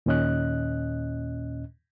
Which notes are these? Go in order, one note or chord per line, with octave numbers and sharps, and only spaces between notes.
D#2 A#2 C#4 D#5 F#6